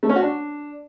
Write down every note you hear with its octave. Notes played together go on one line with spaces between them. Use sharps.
A3
C#4
F#4
D4